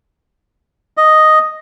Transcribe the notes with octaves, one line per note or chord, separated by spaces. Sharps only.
D#5